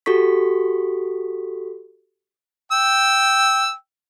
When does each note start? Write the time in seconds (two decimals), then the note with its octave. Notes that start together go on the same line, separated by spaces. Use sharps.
0.06 F#4 G4 A4 C#6 B6
2.72 G5 E6